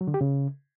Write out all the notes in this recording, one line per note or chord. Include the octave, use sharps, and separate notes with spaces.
F#3
D3
G4
C#3